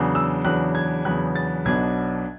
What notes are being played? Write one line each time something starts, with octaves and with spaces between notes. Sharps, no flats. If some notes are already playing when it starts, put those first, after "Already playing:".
Already playing: E2 C#3 F#3 B3 D4
E6
E2 C#3 F#3 B3 D4 F#6
G#6
E2 C#3 F#3 B3 D4 F#6
A6
B1 B2 F#3 B3 D4 G#6